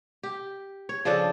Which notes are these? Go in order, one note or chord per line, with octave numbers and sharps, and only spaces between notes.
G4
C#5
C#3 F3 D4 A4